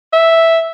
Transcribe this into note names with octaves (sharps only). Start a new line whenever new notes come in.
E5